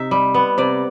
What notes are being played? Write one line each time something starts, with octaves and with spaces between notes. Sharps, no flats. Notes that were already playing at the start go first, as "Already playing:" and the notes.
Already playing: C3 D#4 E5
G3
B3
C3 D5